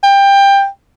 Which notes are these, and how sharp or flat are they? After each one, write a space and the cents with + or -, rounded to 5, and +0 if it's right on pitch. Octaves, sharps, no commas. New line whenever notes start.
G5 +20